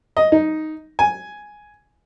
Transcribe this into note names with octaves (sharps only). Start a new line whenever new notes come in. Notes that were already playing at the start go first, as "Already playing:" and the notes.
D#5
D#4
G#5